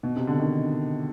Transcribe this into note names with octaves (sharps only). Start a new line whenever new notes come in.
B2
C3
D3
D#3